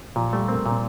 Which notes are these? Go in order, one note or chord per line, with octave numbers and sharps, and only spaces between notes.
A#2 F3
G3 A3
A#3 C4
A#2